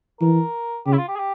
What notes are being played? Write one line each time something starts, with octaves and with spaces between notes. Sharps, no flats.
E3 A#4
C#3 G4
E4
F4
G4
G#4
G4